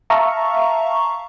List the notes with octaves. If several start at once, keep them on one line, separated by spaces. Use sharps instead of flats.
E5 F5 A5 A#5 C#6